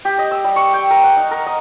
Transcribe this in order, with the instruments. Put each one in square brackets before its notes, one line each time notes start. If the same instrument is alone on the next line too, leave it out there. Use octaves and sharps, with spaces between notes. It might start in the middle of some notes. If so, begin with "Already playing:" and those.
[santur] G4
D#5
E6
G3
C#6
G5
A#4
F#5
D#4
A#4
D#5